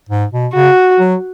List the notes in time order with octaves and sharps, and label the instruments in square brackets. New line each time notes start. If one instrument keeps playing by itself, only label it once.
[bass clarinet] G#2
B2
[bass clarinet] C#3 [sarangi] F#4
[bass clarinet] F#3